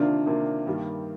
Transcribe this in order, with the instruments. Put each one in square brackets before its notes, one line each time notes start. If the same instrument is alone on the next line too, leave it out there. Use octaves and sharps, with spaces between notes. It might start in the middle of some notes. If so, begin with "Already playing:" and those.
Already playing: [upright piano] C3 D#3 A#3 F4 [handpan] D4
[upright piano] C3 D#3 A#3 F4
G2 D#3 G3 A#3